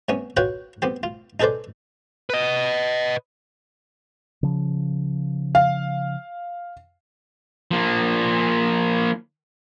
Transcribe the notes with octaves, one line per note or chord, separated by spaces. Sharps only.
C3 B3 C#4
F4 F#4 B4 C#5 F#5 G5
B3 C4 G4
F4
D#4 G#4 A4 B4 C5 D5
B4 D#5
C#3 F3
F5
F3 A#3